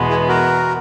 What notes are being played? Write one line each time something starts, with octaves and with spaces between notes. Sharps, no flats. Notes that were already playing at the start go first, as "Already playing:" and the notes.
Already playing: E2 B2 G#3 B3
E4 G#4
F#4 A#4